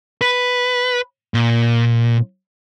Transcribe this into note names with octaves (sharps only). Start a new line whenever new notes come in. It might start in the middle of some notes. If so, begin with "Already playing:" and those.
B4
A#2